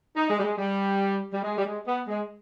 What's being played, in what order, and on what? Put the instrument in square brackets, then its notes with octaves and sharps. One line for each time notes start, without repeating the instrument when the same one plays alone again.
[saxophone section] D#4
G#3
G3
G#3
G3
G3
G#3
G3
G#3
B3
G#3